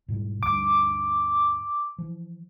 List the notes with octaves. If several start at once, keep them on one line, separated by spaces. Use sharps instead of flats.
G#2 B2 G3
D2 G2 D6
E3 F3